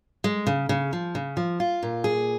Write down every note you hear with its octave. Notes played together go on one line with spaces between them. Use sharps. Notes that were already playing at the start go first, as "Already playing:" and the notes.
G#3
C#3
C#3
F3
C#3
F3
F4
A#2
G#4